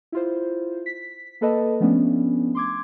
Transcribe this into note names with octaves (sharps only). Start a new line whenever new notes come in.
E4 F4 C5
B6
A#3 A4 B4 D#5 A5
F3 A3 B3 C#4 D4
C6 D6 G#6